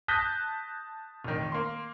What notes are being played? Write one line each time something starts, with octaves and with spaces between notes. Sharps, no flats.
A5 D#6 F#6 G6 A#6 B6
F1 D#3
A#3 C6